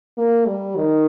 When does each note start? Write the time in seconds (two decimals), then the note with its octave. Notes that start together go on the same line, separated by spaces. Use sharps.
0.18 A#3
0.46 G3
0.76 D#3